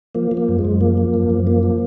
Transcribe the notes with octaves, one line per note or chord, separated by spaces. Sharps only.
F3 A#3
F3
A#3
F#2
G#3
F#2
F3 A#3
F3
F#2
F#2
F3 A#3
F3